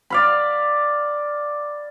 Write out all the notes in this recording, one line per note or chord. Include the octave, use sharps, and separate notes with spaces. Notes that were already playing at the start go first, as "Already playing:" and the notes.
D5 F5 B5